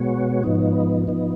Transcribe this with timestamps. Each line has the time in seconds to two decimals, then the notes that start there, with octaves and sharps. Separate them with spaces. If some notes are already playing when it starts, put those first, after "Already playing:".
Already playing: B2 G#3 B3 F#4 C#5
0.43 G#2 F3 B3 D#4
1.08 F3 B3 D#4